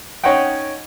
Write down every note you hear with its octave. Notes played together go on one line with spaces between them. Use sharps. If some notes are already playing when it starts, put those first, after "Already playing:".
C#4 D#4 C#5 D#5 F#5 G5